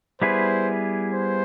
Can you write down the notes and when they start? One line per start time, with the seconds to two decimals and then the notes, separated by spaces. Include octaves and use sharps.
0.21 G3 B3 E4 G#4 B4 C5
1.14 C5